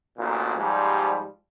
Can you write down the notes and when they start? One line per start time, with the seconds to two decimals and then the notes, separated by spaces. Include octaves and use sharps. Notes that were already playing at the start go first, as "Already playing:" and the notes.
0.18 A1 D2 A#2
0.57 G#2 F3 G3